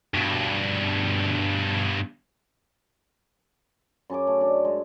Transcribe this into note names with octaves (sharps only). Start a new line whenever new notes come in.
G2 B2
F#2 C#4 G#4 D6
A3
D4
G#3